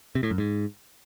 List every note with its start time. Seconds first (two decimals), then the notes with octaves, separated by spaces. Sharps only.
0.15 C3
0.23 A2
0.31 F#2
0.38 G#2